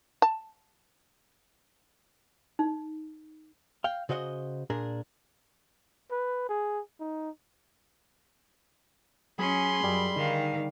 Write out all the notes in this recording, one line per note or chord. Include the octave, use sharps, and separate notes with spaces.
A5
D#4
F5 G5
C#3 F#4 C5 D#5 F5 F#5
A#2 D4 G#4 A#4
B4
G#4
D#4
F#3 C#4 G#4 B5 C6
F#2 G3
D3 D#3 D#4 F5